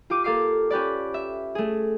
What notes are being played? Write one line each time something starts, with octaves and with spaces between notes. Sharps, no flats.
F4 G4 D6 D#7
A#3 A4 F5 D6 C7
C#4 G4 B4 D5
E5
A3 G#4